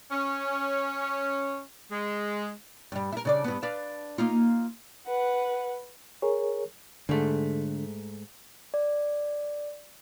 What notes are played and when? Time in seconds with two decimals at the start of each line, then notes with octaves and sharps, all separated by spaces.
0.11 C#4
1.91 G#3
2.92 G2 G3
3.12 E4 A#4
3.25 C#3 D4 D5
3.44 G2 B3
3.63 D4 B4 F5
4.18 A#3 D#4 F4
5.07 B4 F#5
6.22 G#4 A#4 C#5
7.09 G#2 D3 A3
8.74 D5